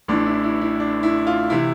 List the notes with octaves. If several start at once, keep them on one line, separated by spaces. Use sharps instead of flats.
A1 A2 E3 D4
E4
E4
E4
D4
E4
F4
C3 E3 E4